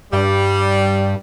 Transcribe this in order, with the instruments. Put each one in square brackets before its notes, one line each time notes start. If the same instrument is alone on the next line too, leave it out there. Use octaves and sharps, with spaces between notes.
[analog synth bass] G2 [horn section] G3